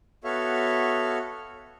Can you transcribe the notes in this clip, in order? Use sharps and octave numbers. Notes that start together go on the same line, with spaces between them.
B3 F#4 A4 C#5 E5 F5